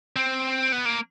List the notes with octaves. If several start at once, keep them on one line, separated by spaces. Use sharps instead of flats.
C4
B3
A#3